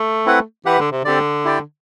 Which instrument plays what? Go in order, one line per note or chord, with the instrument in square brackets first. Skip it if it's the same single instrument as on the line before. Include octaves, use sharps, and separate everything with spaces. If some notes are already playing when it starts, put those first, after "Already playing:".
Already playing: [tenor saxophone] A3
[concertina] C4 E4 B4 F#5
[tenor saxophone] E3 [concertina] G4 B4 F#5
[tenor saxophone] D3
C3
[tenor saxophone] D3 [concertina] C4 G4 D5
[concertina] E4 G4 D5 G5